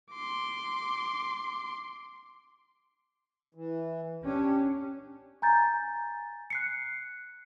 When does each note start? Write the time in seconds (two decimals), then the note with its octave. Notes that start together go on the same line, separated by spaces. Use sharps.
0.11 C6 D6
3.55 E3
4.24 C#4 D4 G4
5.42 G#5 A#5 G6 A6
6.50 F#6 C7 C#7